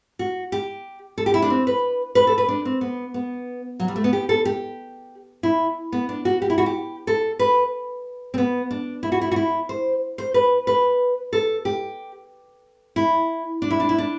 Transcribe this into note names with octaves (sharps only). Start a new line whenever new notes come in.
F#4
G4
A4
G4
E4
D4
C4
B4
B4
A4
B4
D4
C4
B3
B3
F#3
G3
A3
B3
G4
A4
G4
E4
B3
D4
F#4
G4
E4
F#4
G4
A4
B4
C4
B3
D4
E4
F#4
E4
F#4
E4
C5
C5
B4
B4
A4
G4
E4
D4
E4
D4
E4
D4